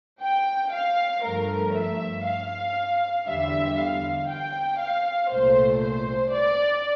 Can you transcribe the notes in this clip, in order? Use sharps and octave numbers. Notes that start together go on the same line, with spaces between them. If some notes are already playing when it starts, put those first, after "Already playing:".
G5
F5
G2 F3 A3 A#4
E5
F5
E2 D3 G3 E5
F5
G5
F5
C2 A#2 A3 C5
C5
D5